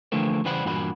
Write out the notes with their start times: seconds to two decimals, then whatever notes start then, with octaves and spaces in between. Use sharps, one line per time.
0.12 D3 E3 F3 A3 A#3 C4
0.45 C#3 E3 G3 C5 F#5 B5
0.65 G2 A#2 E3 F#4 F#5 B5